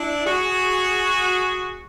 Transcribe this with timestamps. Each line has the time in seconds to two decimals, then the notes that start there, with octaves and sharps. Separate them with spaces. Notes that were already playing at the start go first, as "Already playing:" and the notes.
Already playing: D4 E4
0.25 F#4 G#4